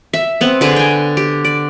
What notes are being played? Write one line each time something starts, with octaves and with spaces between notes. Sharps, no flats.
E5
B3 C4
D3 G#4 B4 D6
G5 G#5
G4
D5